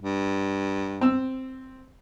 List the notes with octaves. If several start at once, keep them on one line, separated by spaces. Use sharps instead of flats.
G2
C4 E6